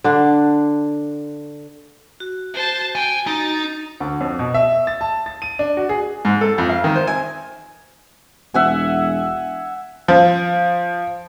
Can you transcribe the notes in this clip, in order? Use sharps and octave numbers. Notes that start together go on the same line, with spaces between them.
D3 D4
F#4
C5 A5
G5 G#5
D#4 A6
D2
F2
B2
E5
A6
A5
A6
D#7
D4
F#4
G#4
G#2
A4
F2
F5
D#3
C5
G#5
E1 E5 F#5 G#5
F3